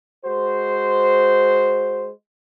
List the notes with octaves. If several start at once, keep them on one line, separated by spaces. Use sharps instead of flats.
G#3 F#4 C5